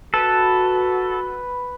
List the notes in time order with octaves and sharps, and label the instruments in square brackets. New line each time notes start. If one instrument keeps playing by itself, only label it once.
[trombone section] F#4 [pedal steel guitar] A4 [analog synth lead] B4